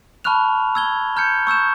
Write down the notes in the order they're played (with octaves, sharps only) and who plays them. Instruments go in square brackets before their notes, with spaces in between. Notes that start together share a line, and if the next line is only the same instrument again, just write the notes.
[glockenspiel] A5 B5 C#6 F6 F#6 F7
E6 G#6 G7
A#5 F6 G6 G#6 C#7
C#6 E6 G6 E7